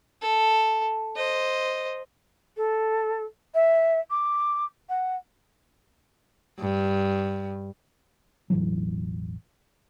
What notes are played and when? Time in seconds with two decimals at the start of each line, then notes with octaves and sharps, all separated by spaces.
0.22 A4
1.16 C5 D#5
2.57 A4
3.54 E5
4.10 D6
4.89 F#5
6.60 G2
8.50 E1 A1 E3 F#3